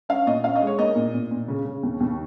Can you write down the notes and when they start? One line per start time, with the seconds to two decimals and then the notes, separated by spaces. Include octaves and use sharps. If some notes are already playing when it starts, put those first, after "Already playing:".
0.09 C#4 F5
0.27 A#2 D#5
0.44 C#4 F5
0.55 D#5
0.62 G#3
0.67 C#5
0.78 A#3 D#5
0.96 A#2
1.14 A#2
1.31 A#2
1.48 C#3
1.65 C#3
1.83 D#2
2.00 D#2